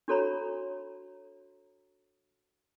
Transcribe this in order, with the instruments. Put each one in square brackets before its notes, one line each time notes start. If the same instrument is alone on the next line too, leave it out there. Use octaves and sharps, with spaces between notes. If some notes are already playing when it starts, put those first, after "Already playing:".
[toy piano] D4 F#4 A4 C#5 A#5 B5